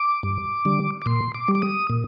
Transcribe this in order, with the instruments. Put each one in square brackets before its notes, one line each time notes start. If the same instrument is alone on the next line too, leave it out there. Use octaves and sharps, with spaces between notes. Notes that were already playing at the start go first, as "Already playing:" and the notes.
Already playing: [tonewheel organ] D6
G2
D3 G3
D6
A#2 C6
D6
G3
D6
D#6
A#2